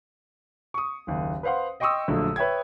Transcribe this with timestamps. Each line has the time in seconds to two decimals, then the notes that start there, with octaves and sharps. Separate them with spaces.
0.74 C#6 D#6
1.07 F#1 D#2
1.43 B4 C5 F5 F#5 C6
1.80 D#5 G5 C6 C#6 D#6 E6
2.08 A#1 D3 F#3 A3
2.36 B4 C#5 E5 G5 G#6